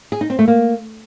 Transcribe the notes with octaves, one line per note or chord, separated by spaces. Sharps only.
G#4
D#4
C4
A3
A#3